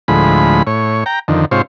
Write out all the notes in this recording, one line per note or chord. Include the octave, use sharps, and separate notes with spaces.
D2 A2 F3 G#3 B5
A2 C#5
G5 A#5
F2 D3 D#3
G#2 C3 F4 C5 C#5